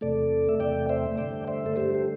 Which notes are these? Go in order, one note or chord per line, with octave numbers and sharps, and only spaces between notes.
E2 C3 A3 A4 D5
E5
E2 C3 A3 D5 G5
C5 E5
G2 D3 A3 D5 G5
C5 E5
A4
G2 D3 A3 G4 C5
G4